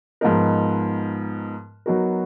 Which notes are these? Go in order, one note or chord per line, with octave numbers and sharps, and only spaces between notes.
G#2 F3 B3 D#4 A#4
F#3 B3 D#4 F#4 A#4